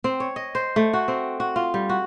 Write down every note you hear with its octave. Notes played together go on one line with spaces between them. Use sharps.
C4
C#5
D#5
C5
A3
F#4
C4
F#4
F4
G3
F#4